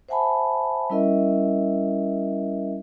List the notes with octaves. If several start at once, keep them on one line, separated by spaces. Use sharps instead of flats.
C5 E5 F#5 G#5 A5 B5
G3 C#4 E4 A#4 D#5 E5